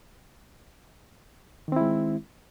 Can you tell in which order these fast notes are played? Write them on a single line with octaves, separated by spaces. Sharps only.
D#3 C4 E4 G#3